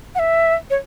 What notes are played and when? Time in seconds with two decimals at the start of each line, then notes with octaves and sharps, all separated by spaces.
0.15 F#5
0.19 E5
0.70 C#5